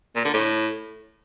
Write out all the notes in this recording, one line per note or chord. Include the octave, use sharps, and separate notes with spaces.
A#2
D3
A2